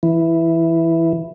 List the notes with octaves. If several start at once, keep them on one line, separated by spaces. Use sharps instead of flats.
E3